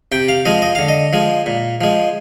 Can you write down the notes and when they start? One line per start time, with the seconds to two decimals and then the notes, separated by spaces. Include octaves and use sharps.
0.12 C3 G5
0.29 F5
0.45 F3 G#3 D#5
0.62 D#5
0.75 D3 F5
0.88 D#5
1.13 F3 G#3
1.46 A#2
1.81 F3 G#3